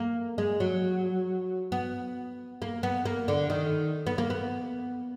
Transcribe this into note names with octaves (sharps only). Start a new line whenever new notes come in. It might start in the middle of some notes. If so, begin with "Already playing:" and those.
Already playing: A#3
G#3
F#3
B3
A#3
B3
A#3
D3
D#3
B3
A#3
B3